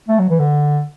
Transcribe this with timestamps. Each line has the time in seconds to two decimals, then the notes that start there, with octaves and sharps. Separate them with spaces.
0.08 A3
0.19 F#3
0.29 E3
0.39 D3